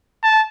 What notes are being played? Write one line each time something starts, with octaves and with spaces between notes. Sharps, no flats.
A5